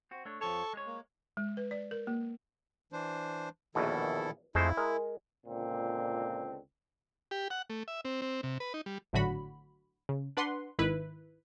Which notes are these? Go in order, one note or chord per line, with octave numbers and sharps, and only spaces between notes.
C4 F#4
A3 D4 C#5
F2 F3 A4 C#5 A5 C#6
G#3 C#5
A#3
G#3
B4
D5
A#4
A#3
E3 D4 C5
A#1 E2 B2 D#3 E4 A4
F2 G#3 A3 E4 C5
G#3 A#4
C#2 A#2 D3 C4
G4
F#5
A3
E5
C4
C4
C3
B4
D#4
G3
G#1 A2 D3 F#3 F#4 B5
C#3
D4 B4 F#5 C6
G#1 D#3 E4 B4